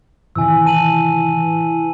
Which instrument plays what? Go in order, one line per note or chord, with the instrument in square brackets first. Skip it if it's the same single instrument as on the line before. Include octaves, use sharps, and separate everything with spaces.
[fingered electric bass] A2 C3 D#3 [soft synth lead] E3 [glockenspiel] G#5 E6
[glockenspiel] A5 D#7 F#7